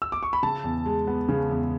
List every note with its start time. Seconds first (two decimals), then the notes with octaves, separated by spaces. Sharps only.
0.02 E6
0.12 D6
0.23 C#6
0.33 B5
0.43 C#3 A5
0.64 E2
0.86 G#3
1.07 B3
1.29 C#3
1.49 E2